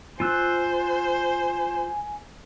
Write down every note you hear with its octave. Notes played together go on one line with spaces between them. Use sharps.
F4 C5 G#5 E6 F#6